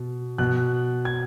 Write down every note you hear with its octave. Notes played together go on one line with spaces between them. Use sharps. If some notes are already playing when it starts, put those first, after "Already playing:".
Already playing: B2
B2 F#6
G#6